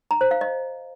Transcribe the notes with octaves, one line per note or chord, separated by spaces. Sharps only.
A#5
C5
F5
D#5